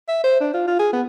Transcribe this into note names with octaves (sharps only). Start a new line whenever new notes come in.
E5
C5
D4
F4
F4
G#4
B3